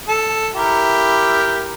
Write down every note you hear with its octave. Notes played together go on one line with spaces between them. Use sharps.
A4
E4 G4 A#4